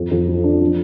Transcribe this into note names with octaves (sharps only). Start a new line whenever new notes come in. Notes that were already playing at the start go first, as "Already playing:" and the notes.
Already playing: F2
F2
F3
D4
F3